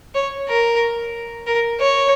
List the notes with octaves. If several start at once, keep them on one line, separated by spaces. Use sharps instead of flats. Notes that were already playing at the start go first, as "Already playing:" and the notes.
C#5
A#4
A#4
C#5